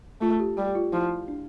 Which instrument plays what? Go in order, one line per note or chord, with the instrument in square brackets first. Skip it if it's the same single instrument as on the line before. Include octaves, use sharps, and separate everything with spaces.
[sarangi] A3 [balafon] F4
[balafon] G4
[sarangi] G3 [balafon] G4
[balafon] F4
[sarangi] F3 [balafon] E4
[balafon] D4